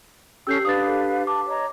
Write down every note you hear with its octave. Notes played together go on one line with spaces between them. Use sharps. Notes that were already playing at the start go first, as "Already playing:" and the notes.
C#4 G4 A4 E6 G6 C7
D4 B4 F5 D#6 A6
A4
A5 D6
C#5 D#5 A#5